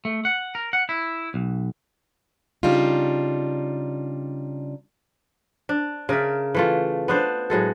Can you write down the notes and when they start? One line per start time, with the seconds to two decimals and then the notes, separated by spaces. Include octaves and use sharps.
0.05 A3
0.25 F#5
0.55 A#4
0.73 F#5
0.89 E4
1.34 B1
2.63 C#3 G3 D4 D#4 F4
5.69 D4
6.09 C#3 A#4 D5 E5
6.55 E3 A3 F4
7.08 B3 D4 C5
7.50 A2 F#3 G#3 A4